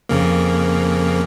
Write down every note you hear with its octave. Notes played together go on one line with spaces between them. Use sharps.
F2 C#3 A#3